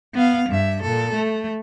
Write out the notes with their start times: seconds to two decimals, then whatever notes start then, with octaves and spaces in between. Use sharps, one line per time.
0.14 B3 F5
0.49 G2 E5
0.82 A#2 A4
1.14 A3